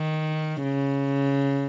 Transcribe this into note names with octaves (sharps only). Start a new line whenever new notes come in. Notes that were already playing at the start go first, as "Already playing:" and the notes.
Already playing: D#3
C#3